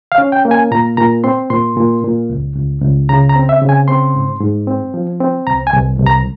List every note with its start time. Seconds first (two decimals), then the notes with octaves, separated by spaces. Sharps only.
0.12 F5
0.18 C#4
0.32 G5
0.45 A#3
0.51 G#5
0.71 A#2 A#5
0.97 A#2 A#5
1.24 C4 C6
1.50 A#2 C6
1.77 A#2
2.04 A#2
2.30 C#2
2.56 C#2
2.82 C#2
3.09 C#3 A#5
3.29 A#5
3.36 C4
3.49 E5
3.61 C#3
3.69 G#5
3.88 C4 C6
4.15 G#2
4.41 G#2
4.67 C4
4.94 F3
5.20 C4
5.47 C2 A#5
5.67 G#5
5.73 C2
6.00 C2
6.06 A#5